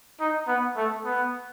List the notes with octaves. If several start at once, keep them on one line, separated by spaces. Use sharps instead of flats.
D#4
B3
A3
B3